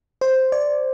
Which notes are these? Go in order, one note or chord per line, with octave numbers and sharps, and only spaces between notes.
C5
D5